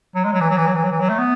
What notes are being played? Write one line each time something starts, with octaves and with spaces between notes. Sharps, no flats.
F#3
G#3
F#3
E3
F#3
E3
F#3
E3
F#3
E3
F#3
A3
B3